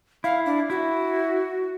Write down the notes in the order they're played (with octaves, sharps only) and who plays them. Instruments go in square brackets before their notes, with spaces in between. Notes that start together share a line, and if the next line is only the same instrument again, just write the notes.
[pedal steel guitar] E4 [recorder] F5
[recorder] D4
[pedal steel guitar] E4 [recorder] F#4